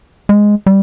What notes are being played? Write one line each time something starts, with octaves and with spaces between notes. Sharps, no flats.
G#3
G3